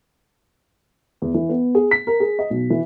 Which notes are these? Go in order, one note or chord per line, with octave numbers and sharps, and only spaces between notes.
E2
E3
B3
G#4
B6
A#4
G#4
D#5
B1
E3